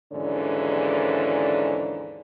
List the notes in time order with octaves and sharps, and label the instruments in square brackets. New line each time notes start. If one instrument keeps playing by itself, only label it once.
[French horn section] D#2 G#2 D3 E3 C#4 D5